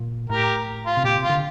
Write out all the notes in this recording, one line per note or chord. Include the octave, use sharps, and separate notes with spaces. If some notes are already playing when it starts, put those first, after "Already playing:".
Already playing: A#2
A2 G4 A#4
F4
C3
A#2 G4
C3
F4
D3